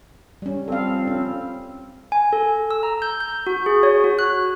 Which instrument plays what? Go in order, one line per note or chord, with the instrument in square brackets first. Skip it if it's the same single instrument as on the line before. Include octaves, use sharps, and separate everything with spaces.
[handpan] G3 C#4
[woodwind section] F3 G3 C4 [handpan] A4 F5
[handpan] C#4
[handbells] G#5
A4
E6
A#5
G6
G6
F#4
G#4
C#5
F#4
F#6